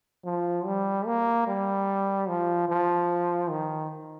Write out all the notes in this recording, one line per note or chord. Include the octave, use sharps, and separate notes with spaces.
F3
G3
A#3
G3
F3
F3
D#3